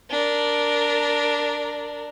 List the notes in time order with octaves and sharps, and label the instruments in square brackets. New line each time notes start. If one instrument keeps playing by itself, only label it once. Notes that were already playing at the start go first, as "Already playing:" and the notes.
[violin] D4 A#4